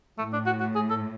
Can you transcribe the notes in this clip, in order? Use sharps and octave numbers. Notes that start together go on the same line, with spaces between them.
A2 A3
D4
F#4
F#4
G#4
A4